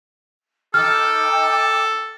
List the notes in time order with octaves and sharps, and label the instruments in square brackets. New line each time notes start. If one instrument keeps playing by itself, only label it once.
[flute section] D#4 G5 D6 [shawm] A4 [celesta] F6